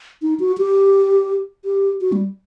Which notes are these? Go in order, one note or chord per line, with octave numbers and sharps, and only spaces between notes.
D#4
F#4
G4
G4
F#4
G3